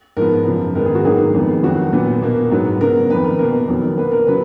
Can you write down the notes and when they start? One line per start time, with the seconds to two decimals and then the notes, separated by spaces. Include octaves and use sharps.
0.17 G#2 F3 B3 A#4
0.46 F#2 C#3 F3
0.75 G#2 D#3 G#3 B3 A#4
0.86 G#4
0.95 F#4
1.05 G#2 D#3 F#3 A#3 G#4
1.35 F2 D#3 G#3 B3
1.63 F2 D#3 F#3 F#4
1.93 A#2 F#3 B3
2.22 B2 A#3
2.51 G#2 F#3 B3
2.81 C#3 F#3 B3 A#4
3.10 F2 D#3 A#3 B4
3.24 A#4
3.39 B2 A#3 A#4
3.68 F2 D#3 F#3 B3
3.97 B2 A#3 B4
4.12 A#4
4.27 C#3 F#3 B4